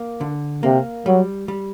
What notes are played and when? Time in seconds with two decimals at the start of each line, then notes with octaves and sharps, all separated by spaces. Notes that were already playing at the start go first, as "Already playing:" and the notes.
Already playing: A#3
0.21 D3
0.63 C3 A#3
1.06 F#3 G3
1.48 G3